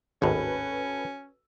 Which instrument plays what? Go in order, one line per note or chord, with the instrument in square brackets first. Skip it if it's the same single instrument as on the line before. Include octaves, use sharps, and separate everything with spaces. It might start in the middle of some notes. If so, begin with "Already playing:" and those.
[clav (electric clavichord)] G#1 D#2 A2 [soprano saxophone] C#4 [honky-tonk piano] F#4 A4 B4